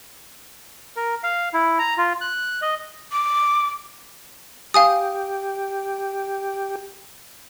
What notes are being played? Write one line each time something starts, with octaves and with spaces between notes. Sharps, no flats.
A#4
F5
E4
A#5
F4
F#6
D#5
D6
G4 F5 G#5 D#6